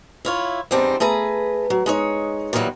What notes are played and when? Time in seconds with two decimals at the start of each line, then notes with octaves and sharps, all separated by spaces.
0.25 E4 F4 C#5
0.71 E2 G3 C4 D4 D#4
1.00 A3 G#4 B4 A#5
1.70 F#3
1.86 G#3 D#4 C#5
2.53 A#2 D#3 E3 F#3 G3